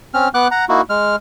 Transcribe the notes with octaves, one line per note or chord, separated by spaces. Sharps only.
C4 C#4 F6
B3 F#5 D6 F#6
F#5 A#5
A#3 D#4 E4 F#4
G#3 F6